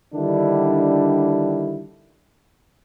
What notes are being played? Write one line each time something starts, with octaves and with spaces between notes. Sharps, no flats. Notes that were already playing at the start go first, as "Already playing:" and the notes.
D3 D#3 G3 D4 E4